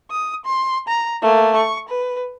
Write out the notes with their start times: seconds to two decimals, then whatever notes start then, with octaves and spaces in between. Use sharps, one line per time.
0.11 D#6
0.45 C6
0.88 A#5
1.22 A3 A#3
1.56 C#6
1.89 B4